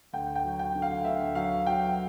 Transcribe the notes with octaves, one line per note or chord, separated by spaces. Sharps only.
D2 G5
G5
F#3
G5
D3
F5
D2 E5
F#3 F5
F#3 G5